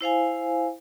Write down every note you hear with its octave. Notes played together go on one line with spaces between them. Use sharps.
E4 C5 F5 G#5